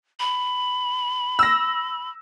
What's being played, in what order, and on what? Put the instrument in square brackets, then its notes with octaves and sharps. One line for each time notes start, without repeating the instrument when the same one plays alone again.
[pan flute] B5
[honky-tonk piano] E6 A#6